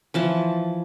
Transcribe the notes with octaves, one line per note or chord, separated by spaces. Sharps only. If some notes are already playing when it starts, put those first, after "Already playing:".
E3 F3 A5